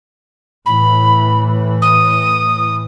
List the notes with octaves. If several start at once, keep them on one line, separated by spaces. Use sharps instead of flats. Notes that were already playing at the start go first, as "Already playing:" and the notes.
A2 E3 B5
D#6